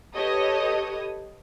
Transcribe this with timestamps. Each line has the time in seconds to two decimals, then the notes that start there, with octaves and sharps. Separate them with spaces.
0.15 G4 A4 B4 C#5 D#5 D#6